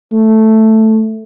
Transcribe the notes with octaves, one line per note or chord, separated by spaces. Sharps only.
A3